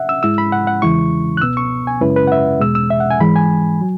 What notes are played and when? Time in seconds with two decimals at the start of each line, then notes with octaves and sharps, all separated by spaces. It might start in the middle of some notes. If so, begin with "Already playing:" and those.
Already playing: E5 F#5
0.09 E6
0.23 G#2 G#3 E4 E6
0.38 B5
0.52 F#5
0.67 F#5
0.82 E2 C#3 E3 G#3 E4 C#6
1.37 F#6
1.42 C#2 B2 B3 E6
1.57 C#6
1.87 G#5
2.01 F#2 C#3 G#3 C#4 E4 B4
2.16 B4
2.27 F#5
2.32 E5
2.60 E2 B2 G#3 E6
2.75 E6
2.90 E5
3.00 F#5
3.10 G#5
3.20 G#2 E3 G#3 B5
3.36 G#5
3.81 F#3